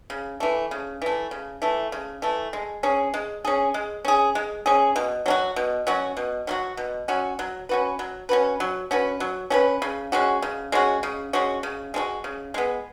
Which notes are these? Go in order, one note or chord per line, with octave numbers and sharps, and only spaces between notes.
C#3
E3 A3
C#3
E3 A3
C#3
E3 A3
C#3
E3 A3
G#3
C#4 G#4
G#3
C#4 G#4
G#3
C#4 G#4
G#3
C#4 G#4
B2
F#3 C#4 F#4
B2
F#3 C#4 F#4
B2
F#3 C#4 F#4
B2
F#3 C#4 F#4
F#3
C#4 F#4 B4
F#3
C#4 F#4 B4
F#3
C#4 F#4 B4
F#3
C#4 F#4 B4
C#3
G#3 C#4 F#4
C#3
G#3 C#4 F#4
C#3
G#3 C#4 F#4
C#3
G#3 C#4 F#4
C#3
G#3 B3